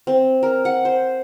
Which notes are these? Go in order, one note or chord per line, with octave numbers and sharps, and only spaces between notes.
C4
A#4
F#5
C5